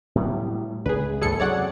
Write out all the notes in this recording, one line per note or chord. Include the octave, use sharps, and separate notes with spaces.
A2 F#3 G3
C#2 G#4 B4
D#2 G#2 C#3 G#4 A4 C#7
F#2 C3 F#3 C#5 D5 F#5